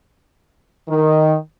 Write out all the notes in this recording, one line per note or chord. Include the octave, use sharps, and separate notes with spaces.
D#3